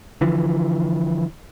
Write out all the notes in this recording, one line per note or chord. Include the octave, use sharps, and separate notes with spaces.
D3 E3 F3